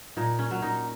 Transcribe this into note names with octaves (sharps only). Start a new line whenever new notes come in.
A#2 D#4
C#4
F#3
D#4